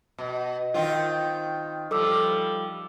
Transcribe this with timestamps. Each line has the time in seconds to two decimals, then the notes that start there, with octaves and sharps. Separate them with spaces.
0.18 B2
0.74 D#3 C4 F4
1.91 F3 G3 A4 D6 E6